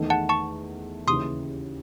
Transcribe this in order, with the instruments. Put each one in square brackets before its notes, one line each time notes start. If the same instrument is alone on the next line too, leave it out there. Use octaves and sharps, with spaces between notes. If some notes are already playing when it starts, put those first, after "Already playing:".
Already playing: [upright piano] E2 D#3 A3 D#4 G#4
[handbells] F#5 A5
A5 C#6
[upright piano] D#2 C#3 E3 [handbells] C6 D#6